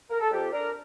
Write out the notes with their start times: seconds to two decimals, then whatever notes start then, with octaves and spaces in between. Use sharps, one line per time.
0.10 A#4
0.20 A4
0.31 F2 G4
0.52 D4 A#4